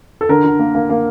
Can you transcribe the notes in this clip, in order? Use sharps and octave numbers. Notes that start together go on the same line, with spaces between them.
A4
D3 A#4
D3
A#3
A#3
A#3